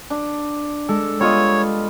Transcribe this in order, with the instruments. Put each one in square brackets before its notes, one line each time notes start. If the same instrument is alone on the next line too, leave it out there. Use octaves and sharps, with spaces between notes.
[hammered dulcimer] D4
[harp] G#3 [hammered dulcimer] A4
[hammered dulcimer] G3 F4 D#5 [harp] B3 [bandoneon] C#5